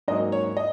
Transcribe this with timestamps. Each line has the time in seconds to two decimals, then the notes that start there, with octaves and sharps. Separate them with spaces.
0.08 G#2 F#3 A#3 C#4 D#5
0.32 C#5
0.57 D#5